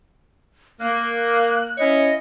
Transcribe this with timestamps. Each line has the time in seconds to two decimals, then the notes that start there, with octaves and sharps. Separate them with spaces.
0.80 A#3 F#6
1.78 C#4 E4 C#5 D#5